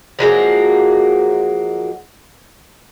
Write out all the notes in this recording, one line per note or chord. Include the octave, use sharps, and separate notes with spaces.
F3 F#3 G#3 A#3